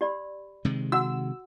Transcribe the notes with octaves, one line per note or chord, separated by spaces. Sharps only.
G4 D5 B5
C3 D#3 G#3
F#4 F#5 E6